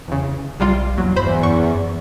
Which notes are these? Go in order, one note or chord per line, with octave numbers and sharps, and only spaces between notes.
E2 C#3
B1 C3 G3 F4
E2 F#3 A#3
E2 G2 C5 B5
F#2 C#6